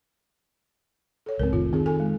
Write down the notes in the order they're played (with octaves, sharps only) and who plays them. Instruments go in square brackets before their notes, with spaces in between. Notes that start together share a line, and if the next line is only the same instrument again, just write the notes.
[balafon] A4 C#5
[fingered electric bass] C#2 G#2 [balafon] C4 A#4
[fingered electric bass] F1 A2 D#3 [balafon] F4
[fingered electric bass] D#3 [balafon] C4 G#4
[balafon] A4 G#5
G#3